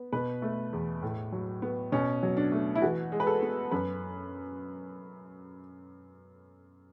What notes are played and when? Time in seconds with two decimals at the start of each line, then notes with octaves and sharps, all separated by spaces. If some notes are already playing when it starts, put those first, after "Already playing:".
Already playing: B3
0.13 B2 B4
0.42 A3
0.73 E2
1.02 A2
1.32 F#3
1.62 B3
1.92 B2 C#4
2.23 F#3
2.37 D4
2.52 A3
2.75 E4
2.82 E3 F#4
3.12 G#3
3.20 B4
3.27 A4
3.42 B3
3.71 F#2 B4